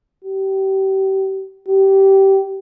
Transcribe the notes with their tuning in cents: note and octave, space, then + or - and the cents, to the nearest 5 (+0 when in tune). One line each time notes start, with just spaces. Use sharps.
G4 -30
G4 -20